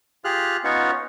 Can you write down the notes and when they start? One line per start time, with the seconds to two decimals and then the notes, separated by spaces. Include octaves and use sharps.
0.25 F4 G4 G#4 F6 F#6
0.64 B3 C#4 D#4 F4 C#5